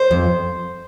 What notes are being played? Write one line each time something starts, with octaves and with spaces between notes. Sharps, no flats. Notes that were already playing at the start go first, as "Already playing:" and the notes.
Already playing: C5
F2